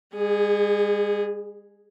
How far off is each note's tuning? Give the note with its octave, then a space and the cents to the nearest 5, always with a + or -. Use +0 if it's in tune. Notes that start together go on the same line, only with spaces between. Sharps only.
G#3 -45 G#4 +0